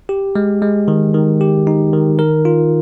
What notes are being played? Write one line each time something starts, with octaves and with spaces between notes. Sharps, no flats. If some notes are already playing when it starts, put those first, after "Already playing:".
G4
G#3
G#3
D#3
D#3
G4
D#4
D#3
A#4
F4